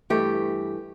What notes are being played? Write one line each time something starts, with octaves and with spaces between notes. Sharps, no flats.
G2 E3 A3 G4